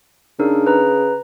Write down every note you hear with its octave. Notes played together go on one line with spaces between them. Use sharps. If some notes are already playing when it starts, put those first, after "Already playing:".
C#3 D4 D#4 A#4
B4 A#5